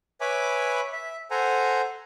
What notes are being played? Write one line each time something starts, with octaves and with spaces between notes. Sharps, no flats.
B4 C#5 E5 G#5 B5 D6
E5
A4 C5 F#5 G#5 A#5